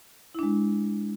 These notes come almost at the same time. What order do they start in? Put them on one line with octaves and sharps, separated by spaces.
E4 D4 G#3